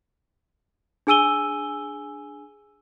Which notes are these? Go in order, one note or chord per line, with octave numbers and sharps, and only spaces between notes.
D4 G#4 G#5 E6 D#7 G7